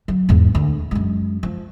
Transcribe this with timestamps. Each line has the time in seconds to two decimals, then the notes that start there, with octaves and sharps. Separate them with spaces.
0.08 F#3
0.29 E2 G#2
0.55 D2 D3
0.91 F#2 G#3
1.43 F3